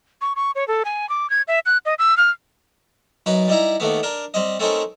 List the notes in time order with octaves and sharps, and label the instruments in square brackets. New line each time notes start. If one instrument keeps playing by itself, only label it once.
[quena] C#6
C#6
C#5
A4
G#5
D6
G#6
E5
F#6
D#5
E6
F6
[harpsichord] F#2 D#4 B4 B5
G3 D#4 E4 A#5
D#2 D#3 A3 B3
D4 A#4
G3 C4 D#5
A3 C4 C#4 D#4 A#4